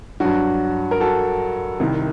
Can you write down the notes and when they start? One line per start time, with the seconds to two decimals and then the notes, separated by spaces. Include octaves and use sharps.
0.20 G2 F#3 D4 F#4
0.91 A#4
1.00 F#4 A4
1.80 C2 C3 D#3